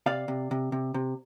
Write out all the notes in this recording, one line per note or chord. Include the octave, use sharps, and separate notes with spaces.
C3 D5 F5
C3
C3
C3
C3